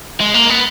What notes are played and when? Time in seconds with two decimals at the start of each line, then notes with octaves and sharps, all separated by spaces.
0.20 G#3
0.34 A#3
0.50 B3